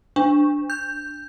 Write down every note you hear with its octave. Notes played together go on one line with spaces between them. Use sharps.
D4
G6